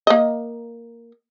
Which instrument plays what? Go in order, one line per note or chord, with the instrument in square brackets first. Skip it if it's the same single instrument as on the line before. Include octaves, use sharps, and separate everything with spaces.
[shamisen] A#3 D#5